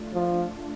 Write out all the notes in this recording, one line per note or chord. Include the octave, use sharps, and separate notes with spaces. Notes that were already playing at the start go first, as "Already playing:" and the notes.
Already playing: A3 D4 F4
F3